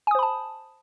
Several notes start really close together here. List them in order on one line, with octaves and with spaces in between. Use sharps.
G#5 D#6 C5 B5 A5